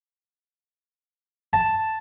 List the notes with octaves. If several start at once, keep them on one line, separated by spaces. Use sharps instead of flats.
A5